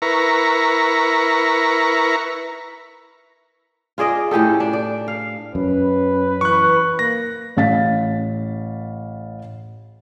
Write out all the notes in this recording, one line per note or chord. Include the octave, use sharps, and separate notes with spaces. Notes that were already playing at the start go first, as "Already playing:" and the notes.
E4 A#4 B4 A#5 C#6
F4 G#4 D5 D#5
A2 C#4 G4 A4
D4
D5
F5
F#2 C#4 B4
E3 C#6 F#6
A#3 A#6
A1 F5 A6 B6